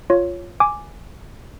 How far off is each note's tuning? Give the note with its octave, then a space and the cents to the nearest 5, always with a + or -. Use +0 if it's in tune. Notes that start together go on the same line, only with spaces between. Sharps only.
F4 +0 C#5 +0
G#5 +0 D6 +0